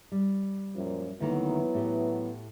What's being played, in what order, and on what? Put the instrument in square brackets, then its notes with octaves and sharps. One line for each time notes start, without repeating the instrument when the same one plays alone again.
[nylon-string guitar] G3
[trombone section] F#2 A#2 F3
[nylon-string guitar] D2 D#3 A#3 [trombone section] E3 F#3 B3
[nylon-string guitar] A2 G4